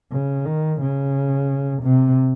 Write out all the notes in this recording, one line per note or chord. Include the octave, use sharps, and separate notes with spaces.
C#3
D#3
C#3
C3